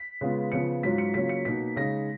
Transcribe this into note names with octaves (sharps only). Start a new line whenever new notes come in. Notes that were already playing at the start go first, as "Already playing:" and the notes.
Already playing: B6
C#3 G#3 B3 F4
C#3 F3 B3 C#7
G#2 F#3 C#4 F4 B6
C#7
C#3 F#3 A#3 C#4 F4 B6
C#7
B2 A#3 D#4 B6
C#3 G#3 D#4 A#6